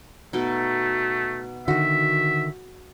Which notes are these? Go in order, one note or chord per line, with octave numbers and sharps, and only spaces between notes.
B2 A3 D#4
D3 D#3 F#4 E5